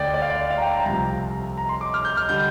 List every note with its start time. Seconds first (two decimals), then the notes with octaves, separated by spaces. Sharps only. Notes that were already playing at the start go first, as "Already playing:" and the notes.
Already playing: D2 D3 D5 G5
0.14 D5
0.22 F5
0.30 D5
0.51 F5
0.58 A#5
0.62 G5
0.73 A#5
0.85 C2 C3 F3 A#5
1.58 A#5
1.69 C6
1.81 D6
1.94 F6
2.05 G6
2.17 F6
2.29 D3 G3 G6